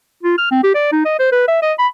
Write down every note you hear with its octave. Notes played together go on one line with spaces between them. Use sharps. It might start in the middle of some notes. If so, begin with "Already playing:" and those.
F4
F6
C4
G4
D5
D#4
D#5
C5
B4
E5
D#5
B5